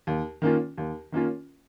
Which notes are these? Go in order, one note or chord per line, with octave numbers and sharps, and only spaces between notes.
D#2
D#3 A#3 C#4 F4
D#2
D#3 A#3 C#4 F4